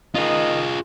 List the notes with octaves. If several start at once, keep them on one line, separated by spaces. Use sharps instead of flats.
D#3 F4 G#4 D#5